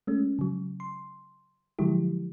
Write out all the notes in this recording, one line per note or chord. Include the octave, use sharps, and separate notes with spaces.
G#3 A3 C#4
C#3 F#3
C6
D3 F3 F#3 G#3 E4 G4